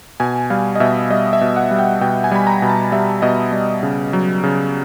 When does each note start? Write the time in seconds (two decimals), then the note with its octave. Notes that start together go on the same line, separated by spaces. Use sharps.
0.20 B2 G#5
0.50 G3 F5
0.76 D#5
0.80 B2 E5
1.10 G3 D#5
1.33 E5
1.41 B2
1.56 F#5
1.71 G3
1.79 G5
2.01 B2 G5
2.24 G#5
2.32 G3 B5
2.47 A#5
2.62 B2
2.69 A5
2.92 G3 E5
3.22 B2 D#5
3.52 G3
3.83 C#3
4.13 F#3
4.44 C#3